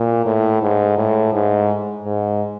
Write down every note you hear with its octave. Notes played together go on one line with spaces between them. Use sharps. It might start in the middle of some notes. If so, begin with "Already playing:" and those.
Already playing: A#2
A2
G#2
A2
G#2
G#2